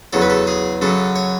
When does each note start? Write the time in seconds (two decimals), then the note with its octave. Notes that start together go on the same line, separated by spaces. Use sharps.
0.13 E2 C#3 F#3 A4
0.22 B4
0.30 A4
0.47 G#4
0.81 F#2 C#3 F#3 A4
1.16 C#5